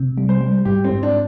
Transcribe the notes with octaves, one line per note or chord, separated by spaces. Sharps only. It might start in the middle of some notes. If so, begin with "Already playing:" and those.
Already playing: C3
G3
C5
G3
G#2 G4
C4
G#2
D4